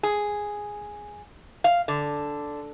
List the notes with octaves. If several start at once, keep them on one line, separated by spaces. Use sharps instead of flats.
G#4
F5
D3